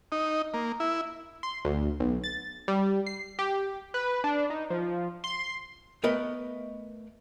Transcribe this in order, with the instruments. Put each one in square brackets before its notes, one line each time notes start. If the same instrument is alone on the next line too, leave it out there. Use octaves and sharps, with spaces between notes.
[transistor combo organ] D#4
A#3
E4
[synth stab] C6
D2
B1
A6
G3
C7
G4
[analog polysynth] B4
D4
D#4
F3
C6
[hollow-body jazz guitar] A3 B3 A#4 B4 D#5